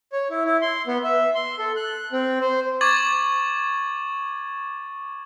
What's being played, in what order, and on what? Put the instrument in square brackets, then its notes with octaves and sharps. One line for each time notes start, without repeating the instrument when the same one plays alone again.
[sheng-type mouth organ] C#5
E4
E4
C6
B3
E5
C6
A4
F#6
C4
C5
[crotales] C#6 D6 G#6 A6 F#7